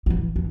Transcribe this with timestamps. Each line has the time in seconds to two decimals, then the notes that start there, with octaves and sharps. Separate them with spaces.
0.06 D#3
0.10 E3
0.36 E3